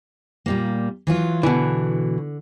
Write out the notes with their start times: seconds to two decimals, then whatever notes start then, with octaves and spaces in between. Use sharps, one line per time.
0.46 A#2 G3 A#3
1.07 E3 F#3 F4
1.43 B2 D3 E3